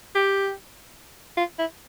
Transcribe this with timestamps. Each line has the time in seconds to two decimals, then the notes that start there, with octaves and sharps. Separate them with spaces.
0.15 G4
1.37 F4
1.59 E4